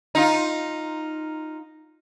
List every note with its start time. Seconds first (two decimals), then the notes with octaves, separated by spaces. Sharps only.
0.15 D#4 F4